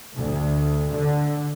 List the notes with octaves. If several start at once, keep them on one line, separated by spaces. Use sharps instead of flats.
D2
D3